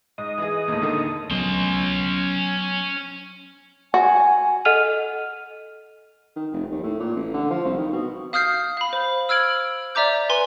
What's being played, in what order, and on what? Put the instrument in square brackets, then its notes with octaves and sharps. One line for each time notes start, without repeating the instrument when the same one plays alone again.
[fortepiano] G#2 [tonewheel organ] D#5
[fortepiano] E3 G#4
D#2 A2
D#2 D3 D#3
[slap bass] F#3 B3 [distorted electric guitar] C#4 C6
[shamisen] F#4 [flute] G#5
[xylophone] A4 D#5 F#5 F6 D#7 F7
[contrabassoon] D#3
F1
D#2
A2
A#2
A1
D3
F3
C2
D#3
B2
[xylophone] F5 D#6 F6 G6 C7
F5 B5
C5
E6 F6 G#6 D7 F#7
D5 E5 A#5 D6 G6
B4 G#5 C6